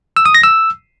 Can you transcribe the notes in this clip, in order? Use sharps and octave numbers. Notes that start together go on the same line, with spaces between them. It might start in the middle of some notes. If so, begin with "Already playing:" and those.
E6
D#6
A#6
E6